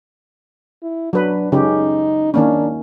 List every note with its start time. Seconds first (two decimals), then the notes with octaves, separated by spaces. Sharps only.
0.83 E4
1.13 F#3 D4 B4
1.52 C#3 C#4 D#4 G4
2.34 D#3 A#3 C#4 D4